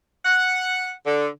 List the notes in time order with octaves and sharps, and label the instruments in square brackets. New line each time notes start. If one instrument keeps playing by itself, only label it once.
[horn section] F#5
D3